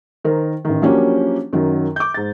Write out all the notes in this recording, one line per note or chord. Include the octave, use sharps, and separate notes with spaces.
D#3 A#4 C5
A1 D#3
F3 F#3 A#3 C#4 D4 G4
F#2 D#3 F#3
D6 G6
G#2 A6